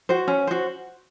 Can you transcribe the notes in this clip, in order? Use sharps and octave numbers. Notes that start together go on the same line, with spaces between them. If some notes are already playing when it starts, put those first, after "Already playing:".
F#4 C5
C#4
F#4 C5